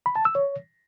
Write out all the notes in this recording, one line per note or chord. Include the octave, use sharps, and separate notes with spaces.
B5
A5
E6
C#5